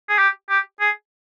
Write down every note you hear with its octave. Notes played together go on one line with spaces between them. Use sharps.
G#4
G4
G4
G#4